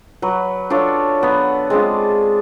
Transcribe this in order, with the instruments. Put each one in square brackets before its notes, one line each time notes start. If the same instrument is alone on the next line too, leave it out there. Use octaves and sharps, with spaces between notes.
[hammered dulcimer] F#3 B4
D4 F4 A4 C#5
F#3 B3
G#3 C4 D4 F4